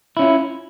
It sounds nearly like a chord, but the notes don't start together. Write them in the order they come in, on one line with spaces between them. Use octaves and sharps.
E4 C#4 F4